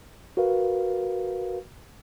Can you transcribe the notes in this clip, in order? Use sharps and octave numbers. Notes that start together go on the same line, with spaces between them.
F#4 A#4 B4 F5